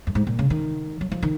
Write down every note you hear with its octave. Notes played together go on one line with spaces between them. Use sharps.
F#2
G#2
A#2
C#3
D#3
F#3
F3
D#3